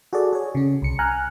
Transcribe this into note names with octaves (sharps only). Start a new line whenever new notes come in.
F#4 G#4 A4 D5
G#4 C#5
C#3 C#4
C2 C#7
G#5 A#5 F6 F#6